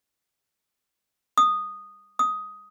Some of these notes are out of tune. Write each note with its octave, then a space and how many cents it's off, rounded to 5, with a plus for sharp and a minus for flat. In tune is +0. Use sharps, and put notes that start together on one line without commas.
D#6 -10
D#6 +10